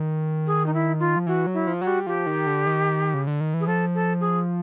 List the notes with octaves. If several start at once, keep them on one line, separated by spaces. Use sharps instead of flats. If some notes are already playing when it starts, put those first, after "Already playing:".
Already playing: D#3
G#4
D#4
E4
F4
F3
E3 F#4
F#3
E4
F3
F#3 F#4
G3
F3 G4
D#3
D3
D#3
C#3
D3
D#3
E3
G#4
F3 A4
A4
G#4